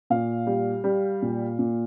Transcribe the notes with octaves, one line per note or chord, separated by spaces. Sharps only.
A#2 F5
G3
G3
A#2
A#2